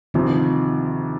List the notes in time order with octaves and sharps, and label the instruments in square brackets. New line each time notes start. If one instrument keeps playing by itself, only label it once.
[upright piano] D2 C3 F3 [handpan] D#3